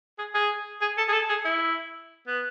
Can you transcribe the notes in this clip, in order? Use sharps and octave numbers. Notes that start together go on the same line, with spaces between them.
G#4
G#4
G#4
A4
G#4
A4
G#4
E4
B3